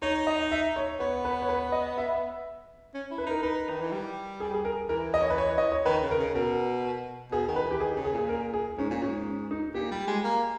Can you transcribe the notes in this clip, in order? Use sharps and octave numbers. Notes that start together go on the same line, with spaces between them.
D#4 C#5
D#5
E5
C#5
B3 C#5
B4
C#5
B4
D#5
E5
C#4
E4
B4
D#4 A#4
D#4 B4
D#3
E3
G3
G#4
G#4
A#4
E3 A#4
D#5
C#5
B4
C#5
D#5
C#5
D#3 B4
C#3
A#4
C#3
B2 A#4
B2 G#4
D#3
B4
E3
G4
D#3 G#4
C#3
G#4
A#2
G#4
A#4
G#4
G#2 C#4
A#2
G#2 C#4
D#4
A#2 G4
G3
G#3
A#3